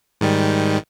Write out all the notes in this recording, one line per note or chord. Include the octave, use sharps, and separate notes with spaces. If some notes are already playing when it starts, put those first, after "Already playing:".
G#2 D#3 G3